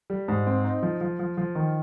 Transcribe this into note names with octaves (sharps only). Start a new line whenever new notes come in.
G3
G#2
C4
D#4
F3
F3
F3
F3
D#3